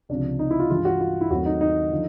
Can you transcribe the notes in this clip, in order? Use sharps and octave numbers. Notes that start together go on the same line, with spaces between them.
C#2 C3 F3 D4
D#4
E4
F4
G2 E3 G#3 F4
F#4
F4
E4
D#2 D#3 F#3 A3 C4 F#4
D#4
D#4
D3 F3